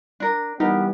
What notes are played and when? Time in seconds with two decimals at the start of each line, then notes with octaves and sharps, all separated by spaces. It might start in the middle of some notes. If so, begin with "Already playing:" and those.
0.20 D4 A#4
0.60 E3 G3 B3 D#4 G4 A#4